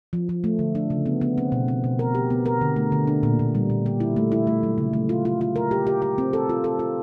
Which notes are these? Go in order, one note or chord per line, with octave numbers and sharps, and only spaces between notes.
F3
F3
A3
D3
D4
C#3
B3
B3
C4
B2
C4
B2
A#4
G4
B3
A#4
D3
A3
D3
D4
A#2
A#2
G3
A#2
G4
E4
A3
E4
A3
F#3
C#3
A3
F4
F4
F4
A#4
G4
G4
G4
C4
A4
F4
A4
F4